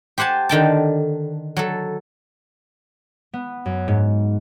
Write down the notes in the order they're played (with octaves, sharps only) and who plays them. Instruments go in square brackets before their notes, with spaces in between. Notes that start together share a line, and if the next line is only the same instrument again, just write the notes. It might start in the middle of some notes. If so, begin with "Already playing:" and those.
[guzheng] G4 C5 F#5 G#5 A5
D3 D#3 G5 A5
F#3 A4
[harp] B3
F#2
G#2